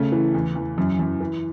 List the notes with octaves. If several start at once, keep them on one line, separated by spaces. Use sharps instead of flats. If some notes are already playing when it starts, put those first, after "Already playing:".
Already playing: C#3 A3
E3
E2
E2
F#2
F#2
E3